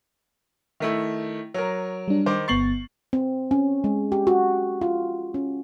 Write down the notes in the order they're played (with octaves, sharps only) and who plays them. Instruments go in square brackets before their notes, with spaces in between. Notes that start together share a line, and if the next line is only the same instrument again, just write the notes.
[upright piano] D#3 A3 E4
F#3 A#4
[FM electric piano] G3 D4
[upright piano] D#3 C5 D6
[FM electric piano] G1 B3 A6 [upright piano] C#6 C7 F#7
[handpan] C4
C#4
G#3
G4
F#4
F4
C#4